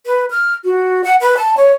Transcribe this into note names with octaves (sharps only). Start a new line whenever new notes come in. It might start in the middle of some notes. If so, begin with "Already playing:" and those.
B4
F6
F#4
F#5
B4
A5
C#5